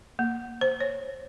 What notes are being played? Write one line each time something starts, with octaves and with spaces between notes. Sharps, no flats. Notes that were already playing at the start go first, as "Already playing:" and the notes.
A#3
C5
C#5